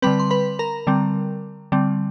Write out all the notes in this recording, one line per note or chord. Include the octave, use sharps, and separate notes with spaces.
D3 G3 C4 B4 B5
C6
B4 B5
A#4 A#5
D3 G3 C4
D3 G3 C4